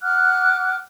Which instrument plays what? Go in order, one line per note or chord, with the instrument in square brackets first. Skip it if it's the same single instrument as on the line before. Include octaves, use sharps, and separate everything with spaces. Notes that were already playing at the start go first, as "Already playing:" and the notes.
[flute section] F#5 D6 F6 F#6